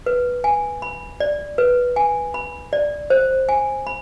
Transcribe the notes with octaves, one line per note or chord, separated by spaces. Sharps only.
B4
G#5
B5
D5
B4
G#5
B5
D5
C5
G#5
B5